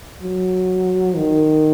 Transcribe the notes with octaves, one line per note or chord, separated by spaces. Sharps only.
F#3
D#3